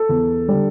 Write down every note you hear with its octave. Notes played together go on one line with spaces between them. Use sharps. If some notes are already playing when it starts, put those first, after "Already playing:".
Already playing: A4
E2
D3 G3